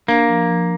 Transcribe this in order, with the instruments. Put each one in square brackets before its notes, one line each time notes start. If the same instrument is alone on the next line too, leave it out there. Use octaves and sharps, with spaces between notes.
[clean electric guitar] A#3 [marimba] D4
[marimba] F3
F3